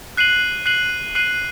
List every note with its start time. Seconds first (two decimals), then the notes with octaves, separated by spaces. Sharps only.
0.17 F#6 C7 D#7 F#7
0.66 F#6 C7 D#7 F#7
1.15 F#6 C7 D#7 F#7